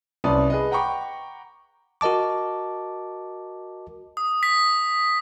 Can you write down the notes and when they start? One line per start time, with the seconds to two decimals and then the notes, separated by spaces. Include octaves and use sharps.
0.24 C2 C#4 B4 D5 A5 D#6
0.50 G#4 B4 D#5
0.71 F#5 G5 A#5 B5 C#6 D6
2.01 F#4 A#4 D#5 A5 D6
4.17 D#6
4.43 B6